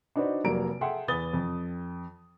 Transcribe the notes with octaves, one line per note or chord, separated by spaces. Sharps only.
D4 D#4 F#4 B4 C5 D5
F1 F#3 A#3 D5 A#5 D7
G#4 A4 E5 F#5 G5 C6
E2 B4 D#6 A6 G7
F2